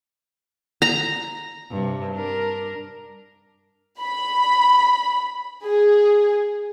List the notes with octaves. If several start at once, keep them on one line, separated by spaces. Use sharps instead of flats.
A#5
G2 C3
D4 A#4
B5
G#4